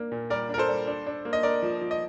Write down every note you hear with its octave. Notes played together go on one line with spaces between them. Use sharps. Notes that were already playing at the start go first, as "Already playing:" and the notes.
Already playing: A#3 D4
A#2
G3 A#4 D5
D4 A#4
A4 C5
G3
D4
D4
A#3
D#5
D4 A#4 D5
F3
F3
D#5